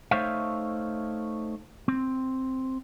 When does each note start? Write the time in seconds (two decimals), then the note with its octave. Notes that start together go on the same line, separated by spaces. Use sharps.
0.11 A3 D#4 C5 C#5 E5 F5
1.88 C4